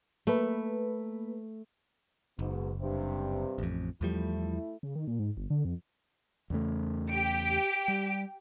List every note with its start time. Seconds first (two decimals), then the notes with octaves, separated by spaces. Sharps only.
0.27 A3 A#3 B4
2.39 F#1 G#2 B2
2.80 G2 C3
3.58 A1 F2
4.01 E2 F3 G3 A3 E4
4.83 C#3
4.96 D#3
5.07 A#2
5.19 G#2
5.37 G1
5.50 D3
5.65 F2
6.50 E2 C#3 A3
7.12 G4 D7
7.88 G3